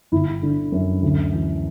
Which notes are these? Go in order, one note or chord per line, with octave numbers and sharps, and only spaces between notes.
G1 E4
D3
F#2
D2
E3